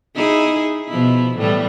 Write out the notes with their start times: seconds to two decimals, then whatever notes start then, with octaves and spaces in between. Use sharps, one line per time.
0.14 D#4 E4 G#4
0.88 B2 F3 E4
1.38 A2 E3 G3